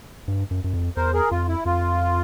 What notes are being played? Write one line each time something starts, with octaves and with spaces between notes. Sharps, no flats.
G2
F#2
F#2
F2
E2 A#4 C5
G#4 A#4
F2 F4
E4
F2 F4